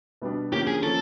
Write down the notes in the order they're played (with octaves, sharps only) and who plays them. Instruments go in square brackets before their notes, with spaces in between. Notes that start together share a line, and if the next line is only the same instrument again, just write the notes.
[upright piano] B2 G3 B3 D4
[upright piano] D3 F3 A#3 C#4 [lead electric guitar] G4
[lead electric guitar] G#4
[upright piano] F3 A#3 C#4 [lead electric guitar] A4